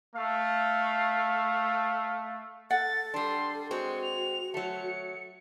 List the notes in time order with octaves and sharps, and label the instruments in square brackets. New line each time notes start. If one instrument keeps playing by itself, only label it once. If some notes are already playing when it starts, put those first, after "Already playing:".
[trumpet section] A3 F5
[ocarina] A4 [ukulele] F#5 [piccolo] A6
[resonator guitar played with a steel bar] G3 D4 [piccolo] C6
[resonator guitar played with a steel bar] G#3 C4 [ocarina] F#4 [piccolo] C#6
[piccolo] F7
[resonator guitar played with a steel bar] F#3 A3 [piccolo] C#7